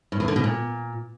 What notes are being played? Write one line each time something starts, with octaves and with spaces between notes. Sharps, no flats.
G2
E2
D3
B2
A#2